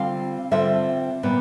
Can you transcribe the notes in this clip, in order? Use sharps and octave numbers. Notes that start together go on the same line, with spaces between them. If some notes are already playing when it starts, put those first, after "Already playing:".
Already playing: D3 G3 C4 F4 F5
D3 G3 C4 F4 E5
A#2 G3 B3